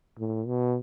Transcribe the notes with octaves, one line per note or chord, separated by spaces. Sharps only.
A2
B2